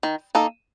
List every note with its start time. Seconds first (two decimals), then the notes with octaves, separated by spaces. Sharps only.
0.03 D#3
0.35 A#3 D#4 A4